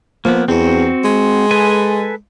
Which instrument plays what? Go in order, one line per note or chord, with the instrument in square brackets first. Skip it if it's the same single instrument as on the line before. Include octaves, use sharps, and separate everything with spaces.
[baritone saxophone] F3 [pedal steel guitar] A#3 B3
[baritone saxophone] E2 [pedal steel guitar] C4 F#4
[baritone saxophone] G#3
[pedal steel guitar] A4 B4 G#5